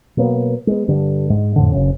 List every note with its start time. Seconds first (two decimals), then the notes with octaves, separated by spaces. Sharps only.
0.17 B2 F#3 A#3 B3
0.67 G#3 B3
0.88 G2 D3 G3
1.30 G#2 G#3
1.56 F2 A2 D3
1.72 F#1 C#3 C#4